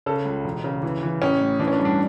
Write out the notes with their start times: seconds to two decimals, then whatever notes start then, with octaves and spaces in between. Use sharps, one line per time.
0.06 C#3 A4
0.25 C#2
0.44 E1
0.64 C#3
0.83 E3
1.03 E3
1.21 A1 C#4
1.41 A2
1.59 E3 D4
1.68 C#4
1.73 D4
1.79 G2
1.85 D4